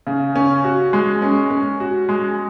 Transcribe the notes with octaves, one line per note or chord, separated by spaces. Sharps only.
C#3
C#4
F#4
G#3
C#4
C#4
F#4
G#3